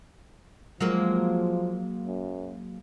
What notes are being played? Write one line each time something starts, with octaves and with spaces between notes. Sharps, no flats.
F3 F#3 G#3 A#3
F#2